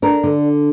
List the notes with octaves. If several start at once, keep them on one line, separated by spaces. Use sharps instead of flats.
D4 A#4
D3